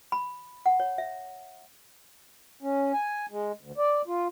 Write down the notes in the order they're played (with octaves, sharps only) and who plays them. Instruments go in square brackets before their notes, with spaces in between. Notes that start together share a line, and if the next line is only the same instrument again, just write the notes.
[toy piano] B5
F#5
C#5
E5
[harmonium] C#4
G#5
G#3
D2
D5
F4